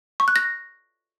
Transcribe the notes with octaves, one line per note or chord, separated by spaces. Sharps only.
C#6
F#6
A#6